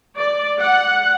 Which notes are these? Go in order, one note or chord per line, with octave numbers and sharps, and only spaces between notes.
D5
F#5